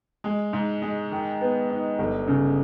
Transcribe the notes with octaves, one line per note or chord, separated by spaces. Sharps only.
G#3
G#2
G#3
D#3
B3
D#4
G1
C#3